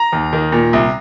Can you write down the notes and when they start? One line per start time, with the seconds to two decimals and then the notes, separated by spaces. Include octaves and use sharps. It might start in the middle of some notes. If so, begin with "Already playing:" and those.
Already playing: A#5
0.12 D#2
0.33 D#3
0.52 A#2
0.73 C2